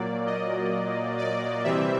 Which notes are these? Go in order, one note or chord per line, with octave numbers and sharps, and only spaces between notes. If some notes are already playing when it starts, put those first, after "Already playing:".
Already playing: A#2 F#3 A#3 D5
D#5
D5
C3 E3 G3 C4 E5